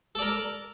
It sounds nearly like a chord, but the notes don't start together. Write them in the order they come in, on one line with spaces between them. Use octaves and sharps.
A4 D5 A#4